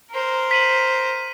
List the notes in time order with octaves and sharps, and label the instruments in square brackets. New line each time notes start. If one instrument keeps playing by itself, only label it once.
[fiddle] A#4 C5
[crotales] B6 D#7 F#7